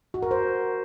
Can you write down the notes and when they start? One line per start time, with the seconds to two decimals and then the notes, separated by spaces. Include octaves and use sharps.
0.14 F#4
0.23 A#4
0.31 C5